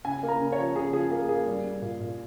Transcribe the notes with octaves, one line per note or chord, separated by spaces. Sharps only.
C#3 G#5
A#3
A#5
C#3
C#5
F3
C#3 G#4
F3 G#4
A#3 G#4
A#3 G#4
G3
G3
A#2
A#2